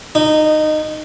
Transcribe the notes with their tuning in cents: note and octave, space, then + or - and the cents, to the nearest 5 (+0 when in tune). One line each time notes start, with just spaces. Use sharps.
D#4 -15